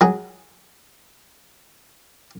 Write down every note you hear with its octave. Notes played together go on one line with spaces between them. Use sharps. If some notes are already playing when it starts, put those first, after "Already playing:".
F#3 G#4